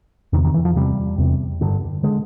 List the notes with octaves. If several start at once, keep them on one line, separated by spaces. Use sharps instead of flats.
E2 C3 D#3
D#3
E3
F3
E2 C3 G3
E2 C3
G2 D3
D3 G#3